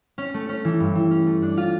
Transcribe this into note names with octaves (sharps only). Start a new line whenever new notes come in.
C#4
A3
C#4
E3
G2
E3
C#4
A3
D4
F4